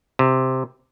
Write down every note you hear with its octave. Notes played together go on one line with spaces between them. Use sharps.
C3